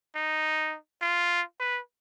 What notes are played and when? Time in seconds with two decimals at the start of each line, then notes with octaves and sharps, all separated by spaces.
0.15 D#4
1.02 F4
1.60 B4